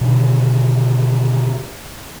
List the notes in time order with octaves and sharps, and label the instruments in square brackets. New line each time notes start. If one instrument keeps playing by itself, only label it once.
[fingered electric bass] B2 D3 D#3